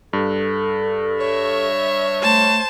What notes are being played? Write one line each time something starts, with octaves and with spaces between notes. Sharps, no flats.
G2 A4
C#5 E5
A3 C5 A5